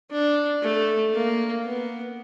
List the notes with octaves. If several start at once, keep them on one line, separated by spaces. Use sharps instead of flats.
D4
A3
A#3
B3